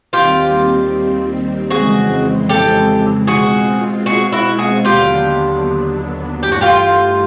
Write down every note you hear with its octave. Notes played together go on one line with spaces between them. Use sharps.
D#2 D#3 G3 C4 F4 G4
F2 C#3 E3 G#3 C4 F#4 G#4
G4 A4
B2 G#3 C4 F4 F#4 G#4
F#4 G#4
E4 F#4
F#4 G#4
D#2 D3 F#3 B3 D4 F4 G4
G2 E3 A3 G4
F#4
F4 G4